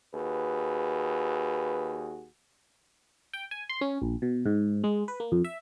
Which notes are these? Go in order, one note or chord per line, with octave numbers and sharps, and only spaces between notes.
D#2 F#4 G#4 B4
G5
G#5
C6
C#4
A#1
B2
G#2
G#3
B4
A#3
F2
E5